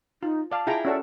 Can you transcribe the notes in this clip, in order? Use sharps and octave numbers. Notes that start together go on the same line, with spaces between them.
D#4 F4
D5 F5 A5
E4 F4 G#4 G5 A#5
C#4 F#4 A4 D5